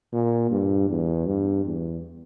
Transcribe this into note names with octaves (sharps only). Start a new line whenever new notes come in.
A#2
G2
E2
G2
E2